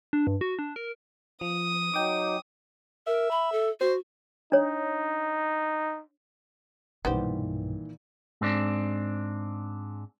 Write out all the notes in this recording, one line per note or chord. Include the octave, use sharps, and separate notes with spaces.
D4
G2
F#4
D4
A#4
F3 D#6
F#3 D#4 G5 D6
A#4 E5
B5
A4
F#4 C5
D4 D#4 C#5
B1 G2 A#2 D#3 E3 B3 G4 C5
G#2 C4 D4